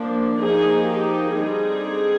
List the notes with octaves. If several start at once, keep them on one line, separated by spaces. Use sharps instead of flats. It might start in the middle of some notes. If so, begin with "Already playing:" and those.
Already playing: F3 A#3 D4
F3 A#3 D#4 G#4
G4
D3 G3 C4 D#4 G#4